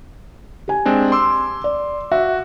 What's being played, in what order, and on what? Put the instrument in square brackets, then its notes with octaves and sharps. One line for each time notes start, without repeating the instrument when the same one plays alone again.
[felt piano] G4 G#5
[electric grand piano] G#3 C4 D4
C6 D6 E6
[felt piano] D5
[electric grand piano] F#4 [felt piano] E5 F5